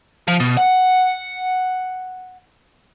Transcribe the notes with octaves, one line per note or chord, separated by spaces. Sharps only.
F3
B2
F#5